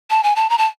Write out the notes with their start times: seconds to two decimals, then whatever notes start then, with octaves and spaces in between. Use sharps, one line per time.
0.10 A5
0.23 G#5
0.36 A5
0.50 A#5
0.58 A5